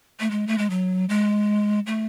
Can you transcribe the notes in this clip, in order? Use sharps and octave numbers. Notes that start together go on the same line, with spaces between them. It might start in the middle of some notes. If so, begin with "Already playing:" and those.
A3
G#3
A3
G#3
F#3
G#3
A3